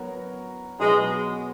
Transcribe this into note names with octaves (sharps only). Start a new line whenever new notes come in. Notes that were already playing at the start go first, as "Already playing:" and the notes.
Already playing: F#3 B3 F#4 A#4 C#5
B2 F#3 G#3 B3 F#4